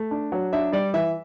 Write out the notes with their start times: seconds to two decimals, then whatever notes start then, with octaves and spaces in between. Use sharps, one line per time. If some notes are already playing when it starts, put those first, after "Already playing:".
Already playing: A3
0.11 D4
0.32 F#3
0.53 D4 E5
0.72 G3 D5
0.94 E3 E5